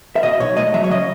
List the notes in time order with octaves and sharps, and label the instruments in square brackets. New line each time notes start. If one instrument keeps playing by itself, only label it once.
[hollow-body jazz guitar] E5
B2 D#5
B1 C#5
A3 D#5
F#3 E5
C#5
C#3 D#5